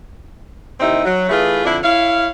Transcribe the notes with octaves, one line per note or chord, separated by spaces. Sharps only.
D#2 C3 C4 D#4 E4 E5
F#3
E3 A3 E4 F4 G#4
F2 D3 D4 E4
E4 C#5 E5 F5